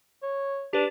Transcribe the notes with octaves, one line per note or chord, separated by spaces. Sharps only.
C#5
D4 G4 B4